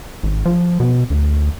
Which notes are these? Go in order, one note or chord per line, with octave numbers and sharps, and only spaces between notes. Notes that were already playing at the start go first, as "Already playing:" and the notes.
G#1
F3
B2
D2